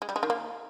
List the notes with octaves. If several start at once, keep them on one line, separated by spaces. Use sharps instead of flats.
G#3
G3
G#3
D#3
A#3